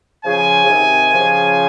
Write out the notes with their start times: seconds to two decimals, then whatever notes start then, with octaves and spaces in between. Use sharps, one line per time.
0.25 C#3 F3 G#5
0.64 C#3
0.69 C3 D#3
1.13 C#3 F3